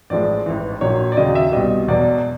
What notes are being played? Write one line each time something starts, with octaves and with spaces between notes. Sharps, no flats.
A1 A2 F3 G#3 D5
A1 G#2 E3
A#1 A#2 F#3 C#5
D5
D#2 C#3 F#3 D#5
E5
C2 B2 G3 D#5
E1 E2 B2 F#3 D5